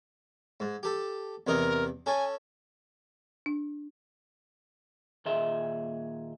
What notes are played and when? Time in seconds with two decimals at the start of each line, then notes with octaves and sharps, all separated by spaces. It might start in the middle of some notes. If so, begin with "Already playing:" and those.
0.60 G#2
0.83 G4 A4
1.47 E2 C3 A#4 D#5
2.06 C#4 A4 G#5
3.46 D4
5.26 D#2 A#2 G#4 D#5 E5 C6